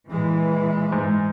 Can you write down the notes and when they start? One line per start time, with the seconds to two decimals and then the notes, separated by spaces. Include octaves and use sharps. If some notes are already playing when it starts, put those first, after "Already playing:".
0.10 A#2 E3 G#3
0.92 G#2